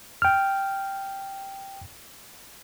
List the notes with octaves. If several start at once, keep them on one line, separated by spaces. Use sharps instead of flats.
G5 F6